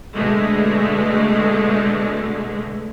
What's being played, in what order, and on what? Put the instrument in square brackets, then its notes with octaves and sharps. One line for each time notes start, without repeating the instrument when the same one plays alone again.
[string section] B2 D3 G#3 A3